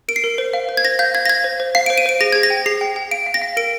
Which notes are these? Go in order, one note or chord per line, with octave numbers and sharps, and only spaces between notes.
A#4 D7
C7
A#4
C5
F5
C5
G#6
C5 A#6
F5 G6
F5 G#6
A#6
F5 G#6
C5
C5
F5 C7
C5 D7
D#7
C5 D7
G#4 A#6
G#4 G#6
A#6
G5
G#4 C7
G5
G5
F5 D7
F5
A#6
F5
A#4 D7